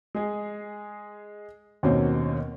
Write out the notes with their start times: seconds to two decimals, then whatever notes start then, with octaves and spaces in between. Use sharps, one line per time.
0.15 G#3 G#4
1.83 D#2 B2 A#3 C4 C#4